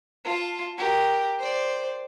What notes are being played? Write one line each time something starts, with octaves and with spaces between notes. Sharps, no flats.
F4 A5
G4 A#4
C5 D5